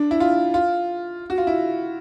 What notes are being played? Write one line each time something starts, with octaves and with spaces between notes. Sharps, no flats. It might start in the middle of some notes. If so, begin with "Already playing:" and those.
Already playing: D4
E4
F4
F4
F#4
F4
E4